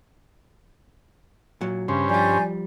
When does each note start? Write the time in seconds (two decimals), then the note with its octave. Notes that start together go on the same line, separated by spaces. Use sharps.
1.61 A#2 F#3
1.88 G2 C#3 C#4 C5
2.09 F3 G3 D5 G#5 G6